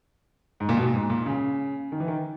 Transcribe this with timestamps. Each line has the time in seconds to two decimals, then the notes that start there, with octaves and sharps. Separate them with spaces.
0.60 G#2
0.69 A#2
0.77 B2
0.85 A#2
0.94 G#2
1.10 A#2
1.26 C#3
1.92 D#3
2.00 E3
2.08 D#3